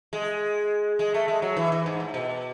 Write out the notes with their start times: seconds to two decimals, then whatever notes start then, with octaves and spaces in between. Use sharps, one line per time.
0.13 G#3
0.99 G#3
1.14 A3
1.28 G#3
1.42 F#3
1.57 E3
1.72 E3
1.86 G#2
2.00 A2
2.14 B2